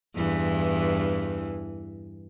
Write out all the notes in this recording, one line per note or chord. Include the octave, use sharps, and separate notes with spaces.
E2 G2 E3